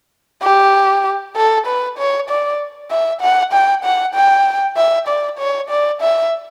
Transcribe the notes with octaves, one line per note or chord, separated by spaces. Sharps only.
G4
A4
B4
C#5
D5
E5
F#5
G5
F#5
G5
E5
D5
C#5
D5
E5